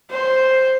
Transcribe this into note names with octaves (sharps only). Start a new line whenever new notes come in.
C5